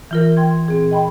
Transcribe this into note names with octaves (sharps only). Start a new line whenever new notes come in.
E3 F4 A#4
A#4 G5 C6 G#6
A#2 C4 G#4
D#5 G5 B5 C6